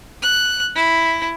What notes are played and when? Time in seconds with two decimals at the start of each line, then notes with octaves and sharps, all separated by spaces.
0.22 F#6
0.75 E4